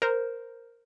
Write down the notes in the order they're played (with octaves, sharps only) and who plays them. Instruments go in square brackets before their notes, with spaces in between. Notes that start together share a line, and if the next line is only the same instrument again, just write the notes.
[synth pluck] A#4 C5